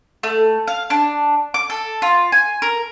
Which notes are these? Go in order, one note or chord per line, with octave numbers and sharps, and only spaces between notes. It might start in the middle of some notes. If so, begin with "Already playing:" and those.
A3
F5
D4
D6
A4
F4
G#5
A#4